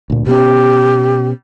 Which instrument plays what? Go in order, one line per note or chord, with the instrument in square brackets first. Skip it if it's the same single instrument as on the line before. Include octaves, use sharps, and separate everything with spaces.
[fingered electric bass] D2 A#2
[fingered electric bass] B2 B3 C#4 [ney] G4